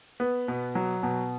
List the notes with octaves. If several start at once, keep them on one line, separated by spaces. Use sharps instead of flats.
B3
B2
F#3
B2